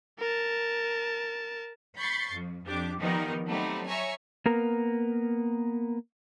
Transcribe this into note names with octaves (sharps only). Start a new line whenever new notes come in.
A#4 A5
B5 C#6 G6 A6 C7
F2
F2 D4 G4 D6
D#3 F3 G3 B3 D#4 A#4
F#3 G3 A3 B3 C4 D#4
C#5 E5 G#5 A#5 C#6
A#3 B3 A#4